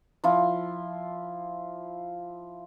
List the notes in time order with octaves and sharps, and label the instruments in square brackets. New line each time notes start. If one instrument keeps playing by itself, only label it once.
[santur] F3 E4 F4